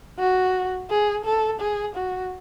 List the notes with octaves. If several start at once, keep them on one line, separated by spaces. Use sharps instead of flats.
F#4
G#4
A4
G#4
F#4